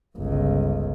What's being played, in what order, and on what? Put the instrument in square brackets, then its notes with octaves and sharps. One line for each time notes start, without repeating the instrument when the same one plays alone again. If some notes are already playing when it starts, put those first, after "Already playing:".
[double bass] G1 C#2